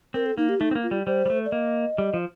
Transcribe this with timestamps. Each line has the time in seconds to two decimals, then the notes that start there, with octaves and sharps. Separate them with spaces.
0.14 C4 A#4
0.26 A4
0.37 A#3 D#4
0.49 G4
0.60 A3 D#4
0.71 C4
0.75 A#3
0.83 F4
0.91 G3
1.06 G3 C5
1.26 G3
1.30 A3
1.45 D5
1.52 A#3 D#5
1.98 G3
2.14 F3